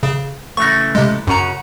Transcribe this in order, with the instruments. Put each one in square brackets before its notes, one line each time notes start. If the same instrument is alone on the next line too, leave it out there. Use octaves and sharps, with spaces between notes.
[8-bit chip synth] C#3
[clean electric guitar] C#3 E3 A3 [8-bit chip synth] C#6 A#6
[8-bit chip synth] C3 G#3
[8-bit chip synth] F#2 A#5 [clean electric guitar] C#3 C#4 F#4